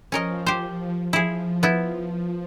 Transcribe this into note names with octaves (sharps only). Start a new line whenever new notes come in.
F3 C#4 A#4 D#5
G4 C5
F3 E4 G#4
B3 E4